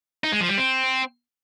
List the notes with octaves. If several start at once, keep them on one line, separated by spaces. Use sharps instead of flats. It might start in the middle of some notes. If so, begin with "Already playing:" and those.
D#4
G#3
F3
G3
C4